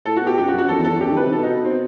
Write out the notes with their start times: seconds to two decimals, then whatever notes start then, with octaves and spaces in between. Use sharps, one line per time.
0.05 A2 A4
0.16 F#4
0.22 B2 G4
0.38 F#2 G4
0.48 F#4
0.53 F#2
0.58 F#4
0.69 E2 A4
0.75 F#2
0.79 E2
0.84 A4
0.90 E2
1.01 F#2 G4
1.11 D#3
1.16 B4
1.22 C3
1.32 B2 A4
1.43 D#4
1.64 B2 C4